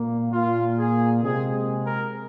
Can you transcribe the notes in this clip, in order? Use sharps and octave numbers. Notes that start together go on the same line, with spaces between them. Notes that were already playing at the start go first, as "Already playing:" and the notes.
Already playing: A#2 A#3
A#2 A#3 F4
G#4
C3 G#3 C4 G#4
A#4